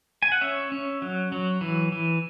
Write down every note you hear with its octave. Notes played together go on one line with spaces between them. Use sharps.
G#5
F#5
C#4 C#5 E5
C#4
F#3
F#3
E3
E3